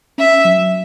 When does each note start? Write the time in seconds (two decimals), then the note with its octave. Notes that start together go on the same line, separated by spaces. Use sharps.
0.18 C#4 E5
0.45 F#3